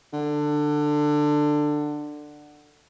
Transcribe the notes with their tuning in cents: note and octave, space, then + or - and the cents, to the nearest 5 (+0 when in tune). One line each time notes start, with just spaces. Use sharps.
D3 +15